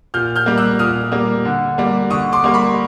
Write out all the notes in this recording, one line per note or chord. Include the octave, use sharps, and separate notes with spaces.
A#2 F6 G6
F6 G6
G3 A#3
E6 F#6
A#2 D#6 F6
G3 A#3
D3
G3 A#3
D3 C#6 D#6
C6 D6
G3 A#3
B5 C#6